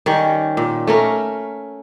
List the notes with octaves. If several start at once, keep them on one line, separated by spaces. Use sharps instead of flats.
D#3 G3 C#4
A#2
A3 C#4 A#4